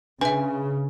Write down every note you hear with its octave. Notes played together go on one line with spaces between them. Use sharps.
C#3 D4 B4 E5 G#5 C6